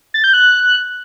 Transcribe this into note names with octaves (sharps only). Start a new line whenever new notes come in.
A6
G6
F#6